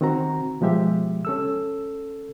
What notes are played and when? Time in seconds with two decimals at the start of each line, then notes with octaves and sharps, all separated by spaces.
0.01 D#3 C4 F#4 A#5
0.61 B2 F3 G#3 G4 E5
1.25 C#4 A4 E6